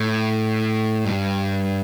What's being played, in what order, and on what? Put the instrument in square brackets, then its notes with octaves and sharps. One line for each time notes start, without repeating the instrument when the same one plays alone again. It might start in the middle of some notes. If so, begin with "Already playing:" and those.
Already playing: [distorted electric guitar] A2
G2